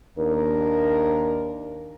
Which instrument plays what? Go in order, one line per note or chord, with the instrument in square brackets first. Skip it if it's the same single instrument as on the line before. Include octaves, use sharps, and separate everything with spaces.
[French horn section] D#2 D4 A#4